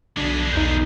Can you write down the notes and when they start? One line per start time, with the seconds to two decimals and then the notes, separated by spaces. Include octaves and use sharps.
0.17 B1 D3 D4 G#4 B6
0.53 B1 E2 D#4 G6